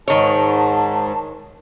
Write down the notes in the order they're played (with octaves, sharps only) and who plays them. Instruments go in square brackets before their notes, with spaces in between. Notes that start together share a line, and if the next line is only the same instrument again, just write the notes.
[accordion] G#2 [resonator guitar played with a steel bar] D#3 C#5 [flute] A5